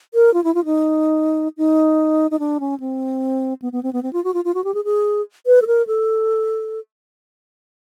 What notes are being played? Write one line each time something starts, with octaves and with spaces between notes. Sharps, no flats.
A#4
F4
E4
F4
D#4
D#4
D#4
D4
C#4
C4
B3
B3
C4
B3
C4
F4
F#4
F4
F4
F#4
G4
G#4
G#4
B4
A4
A#4
A4